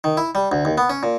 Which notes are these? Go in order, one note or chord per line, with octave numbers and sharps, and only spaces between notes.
D#3
E4
G3
D2
D#2
B3
C#4
A#2